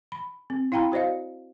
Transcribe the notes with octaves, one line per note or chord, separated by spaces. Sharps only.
B5
C4
E4 F5 G5 A#5 B5
F#4 C5 D5 D#5 F5